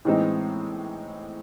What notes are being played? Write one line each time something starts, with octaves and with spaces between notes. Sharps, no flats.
A2 E3 G#3 C4 D#4